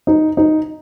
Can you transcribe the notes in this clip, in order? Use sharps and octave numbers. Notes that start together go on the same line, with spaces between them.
D#4
D#4